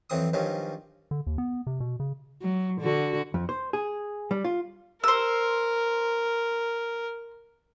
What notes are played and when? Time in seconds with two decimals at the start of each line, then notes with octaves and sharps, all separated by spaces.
0.10 F2 E3 F#3 C4 C6 D#6
0.33 G2 D#3 F3 F#3 C#4
1.11 D3
1.27 D#2
1.38 B3
1.67 C3
1.80 B2
2.00 C#3
2.42 F#3
2.81 D3 F#4
3.34 F2
3.49 C5
3.73 G#4
4.31 G3
4.44 F4
5.04 A#4 C5 E6